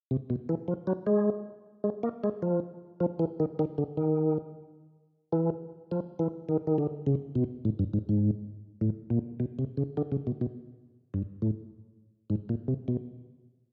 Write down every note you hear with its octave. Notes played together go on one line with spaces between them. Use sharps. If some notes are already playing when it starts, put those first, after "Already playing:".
C3
B2
E3
F3
F#3
G#3
G#3
A#3
G#3
F3
F3
E3
D#3
D#3
D3
D#3
E3
F3
E3
D#3
D#3
D3
C#3
B2
A2
G2
G#2
G#2
A2
A#2
B2
C3
C#3
D3
C#3
B2
B2
G2
A2
G#2
A#2
C3
B2